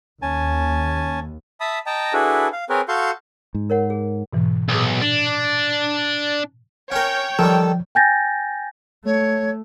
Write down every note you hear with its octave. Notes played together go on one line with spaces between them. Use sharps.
D#2 C#4 G#5 A5
E5 A5 B5 D#6
D#5 G5 A5 A#5
D4 E4 F#4 G#4 A4 B4
F5
C4 G#4 A#4 B4 C#5
F#4 A4 F5 C6 C#6 G6
G#2
A#4 C#5 F#5
G#4
G#2 B2 E3
B1 A#2 G#4
D4
C#4 A#4 C#5 G5
D#3 F3 G3 A4
G5 G#5 G6 A6 A#6
A3 C#5